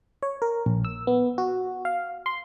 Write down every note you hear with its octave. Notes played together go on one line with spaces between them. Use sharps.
C#5
A#4
A#1
E6
B3
F#4
F5
C6